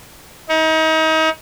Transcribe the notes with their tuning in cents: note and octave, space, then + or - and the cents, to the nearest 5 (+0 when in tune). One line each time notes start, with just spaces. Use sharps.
D#4 +35